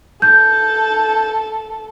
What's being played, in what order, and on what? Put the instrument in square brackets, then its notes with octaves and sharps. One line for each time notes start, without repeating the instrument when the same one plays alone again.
[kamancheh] A4 [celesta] G6